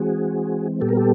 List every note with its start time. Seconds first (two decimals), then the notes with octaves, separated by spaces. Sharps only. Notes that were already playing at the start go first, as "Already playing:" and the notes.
Already playing: E3 G#3 C4 F#4 G#4
0.80 A#2 G3 B3 G4 A4
0.89 A#4
0.97 G4 A4